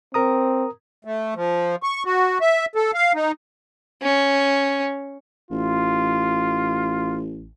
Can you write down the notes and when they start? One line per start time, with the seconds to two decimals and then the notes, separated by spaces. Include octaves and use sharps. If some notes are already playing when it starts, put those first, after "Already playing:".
0.14 C4 A#4 A#5 D#6
1.05 A3
1.35 F3
1.83 C#6
2.05 F#4
2.41 E5
2.75 A4
2.94 F5
3.14 D#4
4.02 C#4
5.51 A1 F4